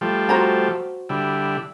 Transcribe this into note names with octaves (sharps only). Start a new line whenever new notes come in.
F3 G3 A3
F#4 C5 A#5
D3 G3 E4